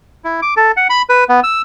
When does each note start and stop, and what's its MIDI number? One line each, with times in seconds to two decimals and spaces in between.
0.24 0.40 64
0.42 0.54 86
0.57 0.72 69
0.77 0.87 78
0.90 1.02 83
1.09 1.24 71
1.29 1.40 59
1.44 1.62 88